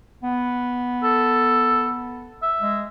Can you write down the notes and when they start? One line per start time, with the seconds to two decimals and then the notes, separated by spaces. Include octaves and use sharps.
0.23 B3
1.04 A4
2.42 E5
2.61 G#3